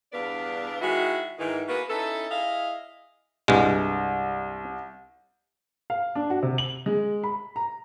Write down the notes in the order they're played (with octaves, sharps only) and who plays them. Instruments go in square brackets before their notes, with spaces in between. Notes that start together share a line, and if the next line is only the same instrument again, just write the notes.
[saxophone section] E2 G2 B3 D4 D5 F5
D#3 G#3 E4 F#4
G#2 D#3 E3
A#3 B3 F#4 G#4 A#4 B4
C#4 D#4 E4 A4
E4 G#4 D#5 F5
[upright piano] C2 [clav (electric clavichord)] G2 G#3
[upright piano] F5
D4
F#4
C3
F#7
G#3
B5
A#5